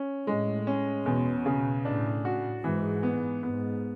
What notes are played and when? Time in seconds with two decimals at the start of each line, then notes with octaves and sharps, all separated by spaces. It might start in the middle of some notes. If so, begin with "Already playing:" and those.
Already playing: C#4
0.27 A2 G#3
0.67 C#4
1.06 E2 B2
1.46 C#3
1.85 A2 D4
2.25 F#4
2.64 G#2 E3
3.03 B3
3.43 G#2 B3